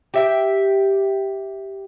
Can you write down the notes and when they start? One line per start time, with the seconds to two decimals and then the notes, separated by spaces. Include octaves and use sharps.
0.14 G4 E5 G5